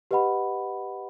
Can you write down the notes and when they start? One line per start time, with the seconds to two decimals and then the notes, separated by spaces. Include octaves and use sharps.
0.11 G4 B4 D#5 F#5 B5